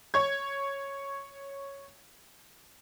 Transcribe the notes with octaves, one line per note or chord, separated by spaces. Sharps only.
C#5 C#6 G#6